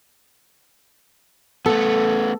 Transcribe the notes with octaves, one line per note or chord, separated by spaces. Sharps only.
A3 B3 A4